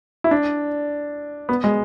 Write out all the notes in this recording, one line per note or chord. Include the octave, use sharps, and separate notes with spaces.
E4
D4
B3
G#3